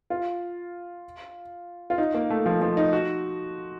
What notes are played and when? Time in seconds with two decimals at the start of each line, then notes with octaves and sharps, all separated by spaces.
0.10 F4
1.90 F4
1.98 D#4
2.14 A#3
2.30 A3
2.46 F3
2.61 F3
2.77 D#4
2.93 F#4